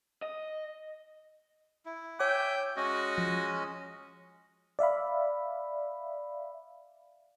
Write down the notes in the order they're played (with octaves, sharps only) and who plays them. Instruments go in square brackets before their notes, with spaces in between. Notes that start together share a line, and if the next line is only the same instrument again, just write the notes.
[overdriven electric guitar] D#5
[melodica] E4
[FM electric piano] C#5 D6 [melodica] E5 G#5 [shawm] G5
[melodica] G#3 C#4 D#5 [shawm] F#4
[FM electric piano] F3
D5 E5 F5 B5